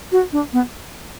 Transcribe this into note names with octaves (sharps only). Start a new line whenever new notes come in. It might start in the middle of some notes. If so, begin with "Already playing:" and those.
F#4
D4
B3